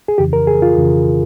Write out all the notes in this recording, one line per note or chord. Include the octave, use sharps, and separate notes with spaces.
G#4
F2 C#3 E3 G4
A#4
G#4
F4
F2 C#3 E3